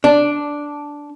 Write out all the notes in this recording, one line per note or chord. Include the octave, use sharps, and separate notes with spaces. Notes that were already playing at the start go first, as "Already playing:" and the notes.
D4